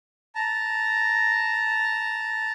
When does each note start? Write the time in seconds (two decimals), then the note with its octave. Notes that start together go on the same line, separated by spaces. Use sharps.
0.35 A5 A#5